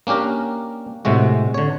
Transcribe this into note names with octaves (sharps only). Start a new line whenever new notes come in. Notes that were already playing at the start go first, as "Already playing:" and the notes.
A#3 C#4 D4 G4 A#4
A2 C3 G#3 F#4
D3 C#5